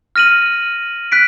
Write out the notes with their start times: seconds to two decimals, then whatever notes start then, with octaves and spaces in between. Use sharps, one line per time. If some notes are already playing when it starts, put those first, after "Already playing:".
0.16 F6 A#6 D#7 F#7
1.12 F#6 B6 D7